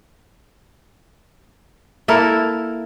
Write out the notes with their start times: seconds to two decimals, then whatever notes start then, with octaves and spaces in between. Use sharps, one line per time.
2.08 A#3 E4 A4 A#4